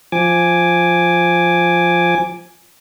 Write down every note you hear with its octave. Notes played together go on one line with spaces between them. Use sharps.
F3 G#5 D6